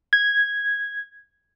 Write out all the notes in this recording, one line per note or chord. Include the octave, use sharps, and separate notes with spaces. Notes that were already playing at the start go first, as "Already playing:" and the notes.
G#6